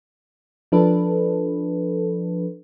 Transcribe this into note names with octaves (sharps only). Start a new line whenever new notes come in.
F3 D4 A4 B4